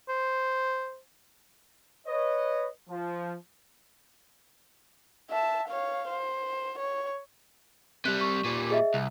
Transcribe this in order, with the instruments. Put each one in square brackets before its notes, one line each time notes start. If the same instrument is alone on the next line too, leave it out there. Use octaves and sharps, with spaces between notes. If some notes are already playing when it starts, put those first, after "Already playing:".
[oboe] C5
[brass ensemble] B4 C#5 D#5
F3
[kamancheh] E5 A5
C#5 F5
C5
C#5
[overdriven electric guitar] C3 G3 [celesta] F#6
[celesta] C#6
[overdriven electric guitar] A#2 G3
[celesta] G#4 D#5 E5
[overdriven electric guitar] C2